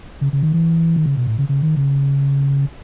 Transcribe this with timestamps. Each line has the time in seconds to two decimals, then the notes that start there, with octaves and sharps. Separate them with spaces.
0.21 C#3
0.33 C#3
0.43 D#3
0.53 E3
0.96 D#3
1.06 C#3
1.17 B2
1.27 A2
1.38 C#3
1.49 C#3
1.62 D#3
1.77 C#3